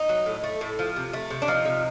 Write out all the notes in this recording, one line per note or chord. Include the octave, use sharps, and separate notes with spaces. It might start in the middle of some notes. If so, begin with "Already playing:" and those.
Already playing: D#4
F#3
A2
A3
A2
F3
C3
A3
C3
D4
F3 D#4
C3